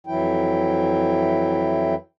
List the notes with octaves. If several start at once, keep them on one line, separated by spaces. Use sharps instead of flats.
F2 E3 F#3 E4 G5